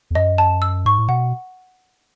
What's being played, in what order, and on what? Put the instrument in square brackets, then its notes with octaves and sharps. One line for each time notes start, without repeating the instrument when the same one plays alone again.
[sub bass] E2
[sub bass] F#2 [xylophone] D#5
[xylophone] A5
E6
[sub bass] G#2 [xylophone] C#6
[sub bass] A2
[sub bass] B2 [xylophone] F#5